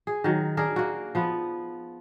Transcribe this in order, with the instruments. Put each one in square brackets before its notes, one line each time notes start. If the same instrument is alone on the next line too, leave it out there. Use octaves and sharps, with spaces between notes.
[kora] G#4
D#3 F#3
D4 G#4 A#4
A#3 F#4
F3 B3